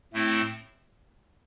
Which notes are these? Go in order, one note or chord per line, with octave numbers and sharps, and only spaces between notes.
A2 A3 C4 E4